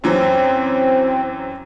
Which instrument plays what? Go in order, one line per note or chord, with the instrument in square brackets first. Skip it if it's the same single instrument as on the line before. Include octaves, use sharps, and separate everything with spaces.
[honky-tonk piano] F#2 E3 F#3 [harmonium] C4